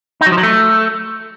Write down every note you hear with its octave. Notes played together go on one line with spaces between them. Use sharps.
D#4
F#3
F3
F#3
A3